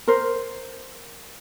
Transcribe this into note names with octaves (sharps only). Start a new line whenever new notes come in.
A#4 C5